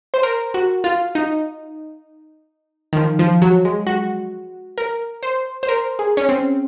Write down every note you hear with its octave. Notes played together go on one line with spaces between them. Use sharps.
C5
A#4
F#4
F4
D#4
D#3
F3
F3
F#3
G#3
F#4
A#4
C5
C5
A#4
G#4
C#4
C4